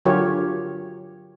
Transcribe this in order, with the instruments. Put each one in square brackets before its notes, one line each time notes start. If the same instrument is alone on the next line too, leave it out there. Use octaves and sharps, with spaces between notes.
[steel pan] D3 F#3 F4 G4 A#4 C#5